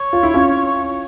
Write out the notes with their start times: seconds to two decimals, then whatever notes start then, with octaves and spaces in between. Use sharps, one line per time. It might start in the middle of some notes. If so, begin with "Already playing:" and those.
Already playing: C#5
0.13 F4
0.23 E4
0.34 C#4 F4